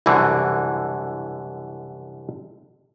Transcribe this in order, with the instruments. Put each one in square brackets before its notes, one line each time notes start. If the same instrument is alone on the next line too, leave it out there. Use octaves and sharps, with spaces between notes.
[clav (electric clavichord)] C2 F#2 B2 D3 E3